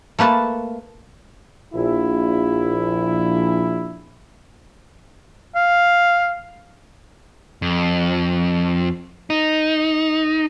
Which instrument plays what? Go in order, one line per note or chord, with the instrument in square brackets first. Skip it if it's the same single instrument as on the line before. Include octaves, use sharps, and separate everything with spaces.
[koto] A3 A#3 B4 A5
[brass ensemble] A#1 E4
[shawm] F5
[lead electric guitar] F2
D#4